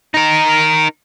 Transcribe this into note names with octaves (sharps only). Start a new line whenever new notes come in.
D#4 A#4